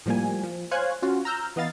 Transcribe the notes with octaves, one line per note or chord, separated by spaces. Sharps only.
A2 F3 G3 A#3 G#5
F3
C5 C#5 F5 G#5 F#6 G#6
C#4 F4 F#4
A#5 E6 F6 G6
E3 B3 D#5 F5 A6